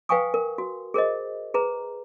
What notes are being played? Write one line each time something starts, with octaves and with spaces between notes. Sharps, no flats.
B4 F5 G5 G#5 C#6 D#6
A#4
F#4
G#4 A#4 C5 D#5
G#4 B4 A#5